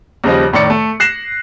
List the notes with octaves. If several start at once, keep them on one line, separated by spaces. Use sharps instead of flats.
D#2 C#3 F3 G3 D#5
F1 A2 D#3 D5 C#7
A3
F#6 A#6 C7 E7